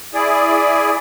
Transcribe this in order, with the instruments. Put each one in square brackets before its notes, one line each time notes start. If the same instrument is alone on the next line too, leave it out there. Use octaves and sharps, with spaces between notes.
[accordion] E4 G#4 D5